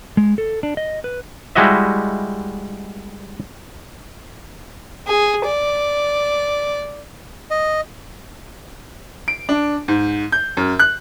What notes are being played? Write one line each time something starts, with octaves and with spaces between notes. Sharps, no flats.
G#3
A4
D4
D#5
B4
G3 G#3 E4 F#4 D#5 E5
G#4
D5
D#5
D7
D4
G#2
G6
F#2
F#6